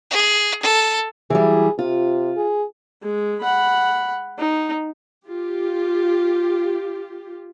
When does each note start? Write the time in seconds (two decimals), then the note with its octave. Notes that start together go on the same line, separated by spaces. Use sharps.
0.11 G#4
0.62 A4
1.30 E3 F#3 G3 G#4
1.79 C3 F4
2.37 G#4
3.03 G#3
3.41 F#5 B5
4.38 D#4
5.27 F4 G4